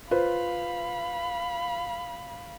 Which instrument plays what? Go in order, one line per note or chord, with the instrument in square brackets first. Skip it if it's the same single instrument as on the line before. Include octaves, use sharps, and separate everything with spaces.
[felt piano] F4 B4 C5 [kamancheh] F5 B5